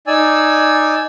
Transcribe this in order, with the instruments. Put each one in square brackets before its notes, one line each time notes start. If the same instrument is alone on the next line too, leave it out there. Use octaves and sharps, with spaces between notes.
[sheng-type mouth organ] D#4 D5 G#5 E6